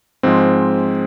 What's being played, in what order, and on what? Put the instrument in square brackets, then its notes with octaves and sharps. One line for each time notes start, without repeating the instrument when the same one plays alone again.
[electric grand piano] G#2 F3 G#3 C4